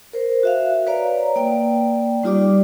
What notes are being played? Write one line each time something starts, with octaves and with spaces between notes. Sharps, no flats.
A#4 C5
F#4 E5 F5
B4 C#5 D5 F5 A#5
A#3 D5 G5
G3 D#4 F4 G4 D5 D6